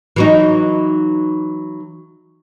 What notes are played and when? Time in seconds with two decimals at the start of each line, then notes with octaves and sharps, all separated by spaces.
0.16 E3 F#3 D#4